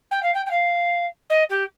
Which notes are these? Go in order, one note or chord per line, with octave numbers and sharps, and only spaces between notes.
G5
F5
G5
G5
F5
D#5
G4